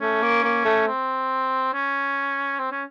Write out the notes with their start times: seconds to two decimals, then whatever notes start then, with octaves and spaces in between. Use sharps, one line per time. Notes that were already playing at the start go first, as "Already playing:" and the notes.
0.01 A3 C#4
0.22 A#3
0.44 A#3
0.65 A3
0.87 C4
1.73 C#4
2.59 C4
2.71 C#4